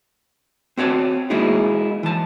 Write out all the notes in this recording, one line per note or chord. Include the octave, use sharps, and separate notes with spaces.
C4 F#4 C#5 A5
G#3 A#3 D#4 E4 F#4 G#4
E3 A5